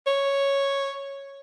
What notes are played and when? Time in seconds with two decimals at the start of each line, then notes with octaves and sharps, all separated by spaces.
0.07 C#5